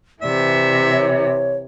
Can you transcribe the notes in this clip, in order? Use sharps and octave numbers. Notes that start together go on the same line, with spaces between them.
C3 E3 D5 E5
C#5